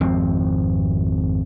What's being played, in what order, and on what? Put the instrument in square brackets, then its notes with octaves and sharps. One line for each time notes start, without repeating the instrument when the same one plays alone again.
[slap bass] G#1 F2 C4